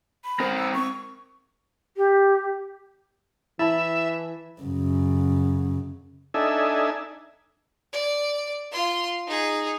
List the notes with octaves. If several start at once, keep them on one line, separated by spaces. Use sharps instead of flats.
B5
C4 A#4 C5
E6
C#6
G4
E3 E4 E5 A5 B5 A6
F#2 C#3
D4 D#4 A4 E5 G#5
D5
F4 C6
D#4 G#4